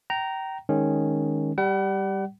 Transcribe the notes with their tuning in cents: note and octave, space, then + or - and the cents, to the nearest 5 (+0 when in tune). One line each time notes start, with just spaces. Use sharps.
G5 -25 A#5 +0
D#3 -5 G#3 +0 C#4 -5
G3 +0 F#5 +40